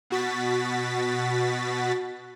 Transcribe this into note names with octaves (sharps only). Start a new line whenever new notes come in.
B2 F#4 A6 B6